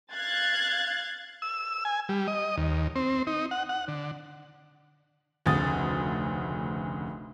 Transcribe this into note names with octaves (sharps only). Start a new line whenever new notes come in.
F5 F#6 G#6 A6
E6
G#5
G3
D#5
D#2
C4
D#4
F#5
F#5
D3
F1 D2 C#3 D#6 A6